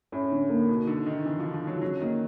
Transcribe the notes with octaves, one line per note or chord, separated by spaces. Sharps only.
A2 C#4
D3
A#3
B2 D#4
D3 D#4
D3 D#3
D3 E3
F3 D#4
F3
F#3 D#4
F3
C#3 F#3
D#3 A#3